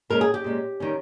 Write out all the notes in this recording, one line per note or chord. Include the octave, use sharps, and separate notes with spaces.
A#2 G#3 C#4 A#4
G#4
G4
A#2 G#3 C#4
D#3 G3 C#4